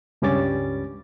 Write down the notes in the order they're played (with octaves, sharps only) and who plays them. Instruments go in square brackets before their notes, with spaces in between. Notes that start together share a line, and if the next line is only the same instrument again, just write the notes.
[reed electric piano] C#2 G2 G3 C#4 D6 A6